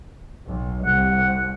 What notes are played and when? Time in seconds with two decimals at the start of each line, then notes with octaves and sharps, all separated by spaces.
0.46 B1
0.85 C2 F#5